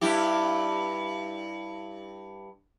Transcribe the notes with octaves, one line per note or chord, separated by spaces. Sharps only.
G2 E4 G4